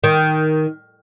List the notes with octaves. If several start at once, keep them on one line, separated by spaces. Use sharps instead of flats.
D#3